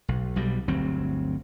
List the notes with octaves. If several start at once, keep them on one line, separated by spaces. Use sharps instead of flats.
B1
B1 B2 G3
G1 D2 F#3 C4